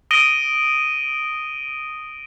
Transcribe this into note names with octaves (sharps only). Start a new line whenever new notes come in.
D#6 A#6 D7 D#7 G7